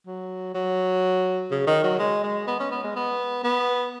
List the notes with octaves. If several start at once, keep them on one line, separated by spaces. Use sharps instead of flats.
F#3
F#3
C#3
D#3
F#3
G#3
G#3
B3
C#4
B3
G#3
B3
B3